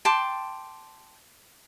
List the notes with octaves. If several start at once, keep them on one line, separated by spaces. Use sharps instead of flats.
G5 A5 C6 D6